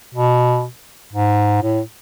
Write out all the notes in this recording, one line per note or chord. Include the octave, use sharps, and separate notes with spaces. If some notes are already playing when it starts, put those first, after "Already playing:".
B2
G#2
A2